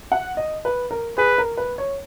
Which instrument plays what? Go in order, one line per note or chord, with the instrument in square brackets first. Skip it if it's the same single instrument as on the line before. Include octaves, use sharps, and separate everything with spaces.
[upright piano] F#5
D#5
B4
A#4
[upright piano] G#4 [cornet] B4
[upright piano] A#4
B4
C#5